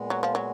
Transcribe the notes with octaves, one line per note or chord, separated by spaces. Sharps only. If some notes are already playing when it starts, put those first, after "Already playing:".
Already playing: A#2 G#3 B3
F#3
F3
F#3